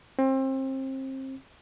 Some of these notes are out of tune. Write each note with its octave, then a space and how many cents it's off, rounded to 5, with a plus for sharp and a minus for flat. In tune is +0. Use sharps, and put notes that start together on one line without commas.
C4 +30